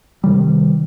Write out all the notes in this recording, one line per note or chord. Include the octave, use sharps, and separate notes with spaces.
C3 D#3 G3